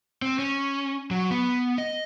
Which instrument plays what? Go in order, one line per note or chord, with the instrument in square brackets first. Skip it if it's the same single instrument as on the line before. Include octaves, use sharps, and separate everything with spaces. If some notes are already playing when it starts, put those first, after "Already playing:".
[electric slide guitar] C4
C#4
F#3
B3
D#5